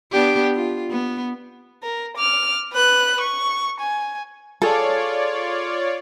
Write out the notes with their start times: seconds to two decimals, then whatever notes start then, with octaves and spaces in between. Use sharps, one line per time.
0.12 B3 D4 G4
0.55 F4
0.90 B3
1.83 A#4
2.16 D6 F6
2.73 B4 F#6
3.20 C#6
3.79 G#5
4.62 F4 G#4 A4 C#5 D5